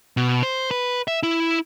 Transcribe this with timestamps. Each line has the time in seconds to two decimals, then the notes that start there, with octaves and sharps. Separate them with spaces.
0.17 B2
0.43 C5
0.71 B4
1.08 E5
1.23 E4